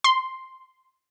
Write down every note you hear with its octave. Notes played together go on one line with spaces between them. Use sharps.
C6